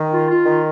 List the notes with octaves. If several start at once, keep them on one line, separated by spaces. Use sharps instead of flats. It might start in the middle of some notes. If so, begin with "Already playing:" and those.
Already playing: D#3
F4
F4
D#3